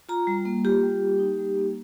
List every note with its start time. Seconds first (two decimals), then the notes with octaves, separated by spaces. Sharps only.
0.09 F4 A#5
0.27 G3
0.45 A#3
0.65 F4 G4
0.83 G3
1.02 A#3
1.19 D#4
1.38 G3
1.56 A#3